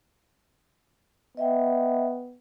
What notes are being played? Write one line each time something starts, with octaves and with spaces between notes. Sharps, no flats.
B3 D#5 E5 G5